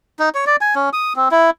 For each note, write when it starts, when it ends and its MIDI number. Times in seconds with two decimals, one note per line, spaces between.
0.19 0.29 63
0.35 0.45 73
0.46 0.56 74
0.61 0.75 80
0.76 0.90 61
0.93 1.13 87
1.16 1.29 60
1.31 1.50 64